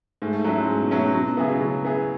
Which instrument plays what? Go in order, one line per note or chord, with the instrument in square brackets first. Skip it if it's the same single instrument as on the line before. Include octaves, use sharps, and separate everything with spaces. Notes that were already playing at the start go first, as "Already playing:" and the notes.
[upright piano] G#2 [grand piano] A3
[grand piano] A3
[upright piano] F#3 C#4 E4 [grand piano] A3
[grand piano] G#3
[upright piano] G#2
[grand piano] B2
[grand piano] B2 [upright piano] F#3 C#4 E4
[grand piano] B2
[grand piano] B2 [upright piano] F#3
[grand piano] B2
[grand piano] C#3 [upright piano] B3 E4 G#4
[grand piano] B2
[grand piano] C#3 [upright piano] F#3
[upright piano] B3 E4 G#4